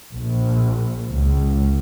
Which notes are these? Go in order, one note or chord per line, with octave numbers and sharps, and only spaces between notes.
A#1
C#2